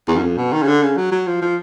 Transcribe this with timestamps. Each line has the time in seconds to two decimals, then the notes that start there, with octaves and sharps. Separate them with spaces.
0.08 E2
0.16 F#2
0.23 F2
0.38 B2
0.53 D#3
0.63 C#3
0.68 D3
0.83 C#3
0.97 F#3
1.12 F#3
1.27 F3
1.42 F3